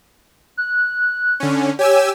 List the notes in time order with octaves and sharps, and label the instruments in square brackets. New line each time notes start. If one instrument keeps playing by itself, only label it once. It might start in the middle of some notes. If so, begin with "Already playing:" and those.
[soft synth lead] F#6
[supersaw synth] D3 C#4
[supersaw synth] G4 G#5 E6 [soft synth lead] C#5